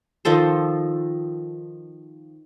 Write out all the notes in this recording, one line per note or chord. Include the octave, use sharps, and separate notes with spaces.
D#3 F3 A4 C5